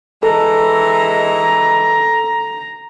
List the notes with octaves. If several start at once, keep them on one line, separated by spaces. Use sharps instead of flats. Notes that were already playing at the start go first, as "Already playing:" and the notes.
E3 G#3 A4 A#5